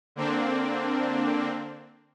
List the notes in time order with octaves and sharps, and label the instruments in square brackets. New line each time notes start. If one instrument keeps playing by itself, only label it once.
[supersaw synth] D3 A#3 C4 D4